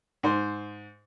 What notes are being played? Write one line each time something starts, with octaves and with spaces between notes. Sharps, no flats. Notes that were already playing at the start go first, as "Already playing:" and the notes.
G#2 C5